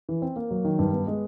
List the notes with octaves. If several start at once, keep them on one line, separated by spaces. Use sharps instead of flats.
E3
C4
A#3
F#3
D#3
G2
B3
G#3